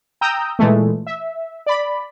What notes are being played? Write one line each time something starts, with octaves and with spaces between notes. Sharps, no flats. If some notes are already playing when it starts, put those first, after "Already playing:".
G5 A#5 D#6 E6 G6
A#2 E3 G#3 A3
E5
D5 B5